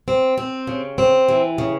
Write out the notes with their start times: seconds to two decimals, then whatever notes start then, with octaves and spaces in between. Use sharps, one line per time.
0.08 C4
0.38 C4
0.67 C#3
0.98 C4
1.28 E3
1.58 C#3